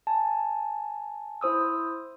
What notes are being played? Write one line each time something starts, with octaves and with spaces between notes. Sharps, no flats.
G#5 A5
E4 C5 D#6 E6